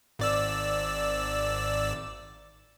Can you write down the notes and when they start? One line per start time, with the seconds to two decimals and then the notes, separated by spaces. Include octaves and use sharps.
0.19 G#1 D5 E6